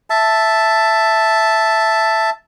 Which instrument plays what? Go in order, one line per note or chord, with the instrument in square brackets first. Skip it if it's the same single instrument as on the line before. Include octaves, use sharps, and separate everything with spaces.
[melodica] E5 A5